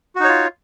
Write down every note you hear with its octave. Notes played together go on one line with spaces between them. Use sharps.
D#4 F4 F#4 C#5